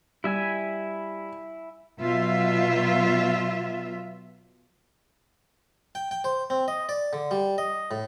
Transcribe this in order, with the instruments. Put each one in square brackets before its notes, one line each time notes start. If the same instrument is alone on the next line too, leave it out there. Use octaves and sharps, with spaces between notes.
[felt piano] G3 [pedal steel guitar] E4 E5 G#5
[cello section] B2 F#3 F4 E5
[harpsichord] G5
G5
C5
C4
D#5
D5
D3
G3
D#5
A2